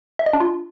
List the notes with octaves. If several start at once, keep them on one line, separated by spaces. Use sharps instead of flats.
E5
D#5
D4
F4